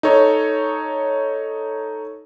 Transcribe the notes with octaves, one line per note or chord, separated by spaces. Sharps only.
D#4 A4 C#5